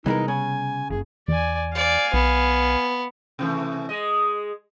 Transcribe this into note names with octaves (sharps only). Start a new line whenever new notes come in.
C3 E3 G3 G#3 B3 D#4 A#4
C#3 G#5
F#1 G#4
E2 D5 G#5
D5 F5 G#5
B1 B3
C3 E3 A3
G#3 D#5